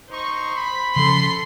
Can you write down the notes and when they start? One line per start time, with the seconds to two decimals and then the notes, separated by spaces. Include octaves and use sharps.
0.10 D#4 C5 C#6
0.55 B5
0.96 C#3 F3 C#4 A4 C6